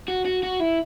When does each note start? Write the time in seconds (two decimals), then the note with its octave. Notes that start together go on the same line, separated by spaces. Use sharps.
0.08 F#4
0.25 F#4
0.43 F#4
0.60 E4